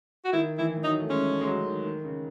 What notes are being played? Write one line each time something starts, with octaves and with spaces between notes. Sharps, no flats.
F#4
D#3 E4
E3 E4
E3
F#3 D#4
A3
G#3 C#4
A3
G#3
F#3
D#3
D#3
C#3